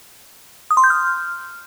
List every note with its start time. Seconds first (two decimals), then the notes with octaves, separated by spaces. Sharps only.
0.71 D#6
0.77 C6
0.84 G6
0.90 F6